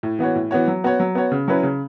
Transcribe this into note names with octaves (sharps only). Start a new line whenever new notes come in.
A2
E3 B3 F#4 C#5
A2
E3 B3 F#4 C#5
F#3
B3 F#4 C#5
F#3
B3 F#4 C#5
C#3
F#3 C#4 E4 B4
C#3